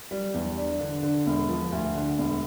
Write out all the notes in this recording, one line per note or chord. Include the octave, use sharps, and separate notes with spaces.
G3
E2
D4
D3
D3
E1
F3
D2
D3
E1